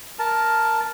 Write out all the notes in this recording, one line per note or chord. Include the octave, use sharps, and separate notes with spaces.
A#4 A5